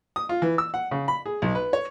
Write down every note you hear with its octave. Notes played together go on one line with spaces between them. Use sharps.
D#6
F4
E3
E6
F#5
C#3
B5
G#4
B1
B4
C#5